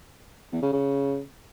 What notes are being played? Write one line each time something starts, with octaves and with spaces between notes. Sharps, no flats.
E2
C#3
C#3